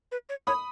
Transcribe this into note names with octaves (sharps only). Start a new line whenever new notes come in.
B4
C#5
C#5 B5 D#6